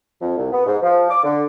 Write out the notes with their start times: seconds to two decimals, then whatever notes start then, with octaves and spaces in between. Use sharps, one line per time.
0.21 F2
0.37 C2
0.52 B3
0.66 G#2
0.83 F3
1.10 D6
1.23 D3